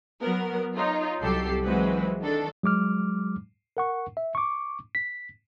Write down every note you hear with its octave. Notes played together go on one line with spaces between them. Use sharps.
F#3 B3 A#4
D#4 F4 C#5
C2 F#3 G4 A4 C7
E3 F#3 G#3 C4 F#4 B4
D#3 D4 A4
F#3 G#3 D6 F6
A#4 F#5 C#6
E5
C#6 D6
B6